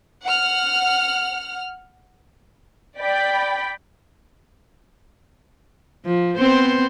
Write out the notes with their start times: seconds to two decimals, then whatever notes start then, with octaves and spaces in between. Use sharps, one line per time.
0.25 F#5 F6
2.99 D5 G5 B5 B6
6.05 F3
6.37 B3 C4 C5